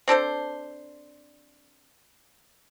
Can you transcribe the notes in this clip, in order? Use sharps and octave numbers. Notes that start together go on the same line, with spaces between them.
C4 D4 A4 C5